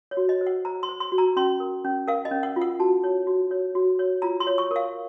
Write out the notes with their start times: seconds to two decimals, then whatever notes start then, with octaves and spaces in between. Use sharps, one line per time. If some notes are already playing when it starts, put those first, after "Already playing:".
0.11 C#5
0.17 F#4
0.29 D#5
0.41 C5
0.47 F#5
0.65 C5 A#5
0.83 C6
0.89 C5
1.00 C6
1.12 F#4
1.18 A#5
1.37 C#4 C6
1.60 A#4
1.85 C#4
2.08 A#4 F5
2.25 D#5
2.31 C#4
2.43 F#5
2.56 F4
2.61 F#5
2.79 F#4 A5
3.04 C#5
3.27 F#4
3.51 C#5
3.75 F#4
3.99 C#5
4.22 F4 A#5
4.40 C6
4.47 C#5
4.58 C#6
4.71 A#4 F5